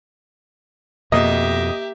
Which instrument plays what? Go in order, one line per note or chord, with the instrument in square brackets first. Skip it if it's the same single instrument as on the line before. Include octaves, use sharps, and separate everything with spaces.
[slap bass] F2 B2 [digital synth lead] A#3 [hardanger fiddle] G4 E5 [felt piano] D#5